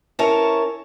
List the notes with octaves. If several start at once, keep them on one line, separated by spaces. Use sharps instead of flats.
C#4 E4 A#4 C#5 A5 A#5